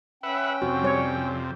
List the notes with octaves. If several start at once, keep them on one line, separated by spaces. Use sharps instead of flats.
C#4 B4 E5 F#5 G5
F2 C3 F#4
G3 C#5